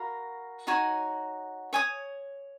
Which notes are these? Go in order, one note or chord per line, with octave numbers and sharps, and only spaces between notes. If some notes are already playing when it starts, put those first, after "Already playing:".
Already playing: F#4 A#4 F5 B5
D#4 F#4 C#5 G#5
C#5 G#5 D#6